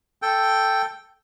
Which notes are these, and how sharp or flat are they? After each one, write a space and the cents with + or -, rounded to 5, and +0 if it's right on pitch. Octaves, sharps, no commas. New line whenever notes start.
A4 +0 G5 +0